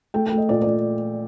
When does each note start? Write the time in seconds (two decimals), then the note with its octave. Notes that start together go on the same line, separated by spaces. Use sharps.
0.14 A3 G5
0.27 G5
0.32 A3
0.38 D#5
0.49 A#2 D5
0.62 A#2 D5